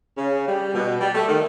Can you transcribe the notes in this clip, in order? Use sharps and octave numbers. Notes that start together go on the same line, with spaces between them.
C#3
G3
B2
G3
A3
D#3